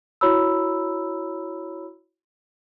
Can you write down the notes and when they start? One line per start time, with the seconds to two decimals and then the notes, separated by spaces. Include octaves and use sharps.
0.21 E4 F#4 C#5 A#5 B5 E6